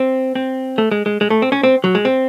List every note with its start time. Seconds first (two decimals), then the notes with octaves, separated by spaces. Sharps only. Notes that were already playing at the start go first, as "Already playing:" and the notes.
Already playing: C4
0.35 C4
0.78 A3
0.91 G#3
1.06 G#3
1.21 G#3
1.30 A3
1.42 C4
1.52 C#4
1.63 C4
1.84 F#3
1.95 G#3
2.05 C4